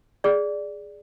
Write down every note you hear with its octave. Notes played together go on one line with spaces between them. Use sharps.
G#4 D5